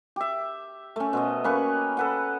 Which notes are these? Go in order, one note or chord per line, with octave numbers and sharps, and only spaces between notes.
G4 E5
A3 C#4
B2 C5 D#5
A#3 C#4 B4 C#6
A4 B4 F#5